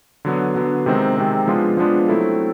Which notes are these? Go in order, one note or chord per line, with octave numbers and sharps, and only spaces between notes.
D3 F#3 B3
D3 F#3 B3
C3 D#3 G#3 C4
C3 D#3 G#3 C4
F3 G#3 B3 D4 F4
F3 G#3 B3 D4 F4
F#3 A3 C4 E4 A4